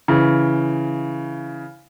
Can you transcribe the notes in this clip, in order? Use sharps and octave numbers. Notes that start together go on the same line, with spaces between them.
C#3 E3